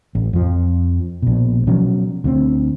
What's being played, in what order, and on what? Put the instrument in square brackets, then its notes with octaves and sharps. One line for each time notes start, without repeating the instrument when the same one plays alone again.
[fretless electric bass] A1
F2 F3
A#1 B2
B2 F3 F#3 C#4
D2 A3 C4